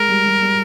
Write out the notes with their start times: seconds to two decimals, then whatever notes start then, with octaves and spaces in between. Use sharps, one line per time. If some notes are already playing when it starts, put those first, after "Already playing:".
Already playing: G#3 A#4
0.09 G3
0.26 G3
0.42 G3